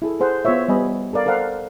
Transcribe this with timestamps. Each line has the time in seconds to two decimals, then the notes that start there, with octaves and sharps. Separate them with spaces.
0.02 E4 G#4 A4
0.20 G#4 A4 C5 F#5
0.45 B3 F4 C5 C#5 E5
0.68 G3 B3 D#5 G#5 B5
1.13 A4 A#4 D5 F5
1.26 A4 A#4 C5 F5 F#5